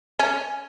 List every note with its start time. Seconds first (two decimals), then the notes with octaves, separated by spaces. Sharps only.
0.19 C#4